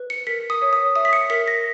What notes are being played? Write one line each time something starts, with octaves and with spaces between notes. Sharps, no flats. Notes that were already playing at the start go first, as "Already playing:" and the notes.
Already playing: B4
C#7
A#4 B6
D#6
C#5
D#6
E5 D#6
B6
C#7
A#4 B6
A#6